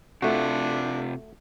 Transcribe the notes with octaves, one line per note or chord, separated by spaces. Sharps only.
C3 A3 D4 F4 F#4